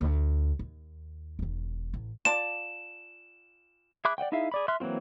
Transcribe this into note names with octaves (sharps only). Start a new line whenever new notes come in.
D2
D#2
E1 D#3
A1
F4 D5 A5 E7
G#4 E5 B5 D6 F#6
D5 D#5 F#5 G5
D#4 E4 G#4 E5 F5
G#4 D5 B5
E5 C6 F6 F#6
E3 F#3 A#3 C4 F4